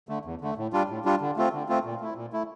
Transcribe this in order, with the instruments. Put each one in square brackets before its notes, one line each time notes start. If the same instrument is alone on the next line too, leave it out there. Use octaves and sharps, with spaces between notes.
[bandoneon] D3 A3
E2
D3 A3
A2
G3 D4 F4
A2
G3 D4 F4
D3
A3 C4 F4
D3
A3 C4 F4
A#2
A3 E4
A#2
A3 E4